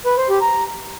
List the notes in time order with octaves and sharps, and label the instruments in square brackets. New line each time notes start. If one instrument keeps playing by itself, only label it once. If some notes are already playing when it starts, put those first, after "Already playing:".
[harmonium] B4
C5
G4
A#5